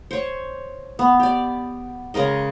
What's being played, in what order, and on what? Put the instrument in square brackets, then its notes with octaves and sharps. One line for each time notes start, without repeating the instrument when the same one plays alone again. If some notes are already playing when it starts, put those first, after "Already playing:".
[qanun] C5 C#5
B3
G4 D5
C#3 G#3 A#4 D#5